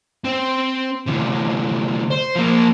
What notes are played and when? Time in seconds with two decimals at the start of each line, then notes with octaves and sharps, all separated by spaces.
0.25 C4
1.06 D2 C3
2.11 C5
2.35 F3 A#3